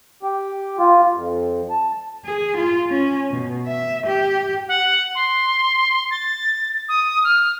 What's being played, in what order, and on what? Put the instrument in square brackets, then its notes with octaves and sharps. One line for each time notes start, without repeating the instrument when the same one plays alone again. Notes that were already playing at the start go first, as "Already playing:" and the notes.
[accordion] G4
F4
F2
A5
[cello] G#4
F4
C#4
B2
E5
G4
[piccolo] F#5
C6
A6
D#6
F6